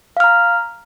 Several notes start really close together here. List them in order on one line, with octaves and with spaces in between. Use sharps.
F5 F6 A#5